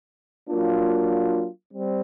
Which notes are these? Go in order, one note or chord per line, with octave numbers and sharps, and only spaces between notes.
F#3 A#3 D4 F4
G3 C4